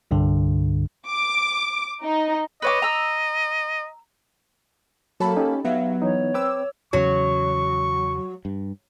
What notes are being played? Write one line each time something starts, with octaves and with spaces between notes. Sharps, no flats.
C2 G2 D3
D6
D#4
B4 C#5 D#5 D6
A#5 E6
F#3 A#3 A4 A5 B5
C#4 D#4 G4
F#3 B3 E5 F5
E3 D#4 C#5
C4 B4 G5 D6 E6
E2 C#3 F#3 C#4 C#6
G2